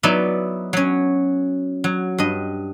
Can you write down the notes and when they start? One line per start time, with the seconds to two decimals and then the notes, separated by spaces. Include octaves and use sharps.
0.03 F#3 B3 D#4 E4 D5 E5
0.73 F#3 C#4
1.84 F#3
2.18 G2 D#5